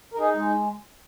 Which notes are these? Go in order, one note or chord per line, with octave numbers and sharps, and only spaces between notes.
A#4
D#4 G#4
G#3